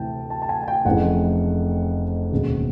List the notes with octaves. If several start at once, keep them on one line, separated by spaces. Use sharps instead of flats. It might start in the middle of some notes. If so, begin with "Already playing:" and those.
Already playing: D2 C3 E3 G5 A5
A5
A5
G#5
G#5
G5
F1 F2 C#3 E3 F#5
E1 D#2 C#3